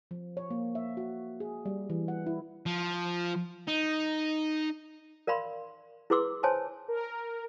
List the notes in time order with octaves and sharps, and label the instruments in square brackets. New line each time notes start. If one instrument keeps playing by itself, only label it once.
[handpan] F3
C#5
A#3
E5
F#4
G#4
G3
E3
F#5
E4
[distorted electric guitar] F3
D#4
[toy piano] A#4 D5 F5 B5 C6
E4 G#4 B4 C6 D6 E6
C5 C#5 G#5 A5 C6
[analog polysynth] A#4